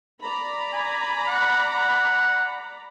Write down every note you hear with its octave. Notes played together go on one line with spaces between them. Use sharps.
D5 A#5 B5
G#5
F#5
F#5